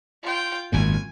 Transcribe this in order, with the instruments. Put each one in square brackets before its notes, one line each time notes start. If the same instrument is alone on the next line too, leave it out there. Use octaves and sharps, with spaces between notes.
[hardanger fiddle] F4 G5
[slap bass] G#1 F#2 A#2 [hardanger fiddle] G#5